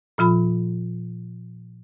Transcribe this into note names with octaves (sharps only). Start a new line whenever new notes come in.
A#2 F3 F4 B5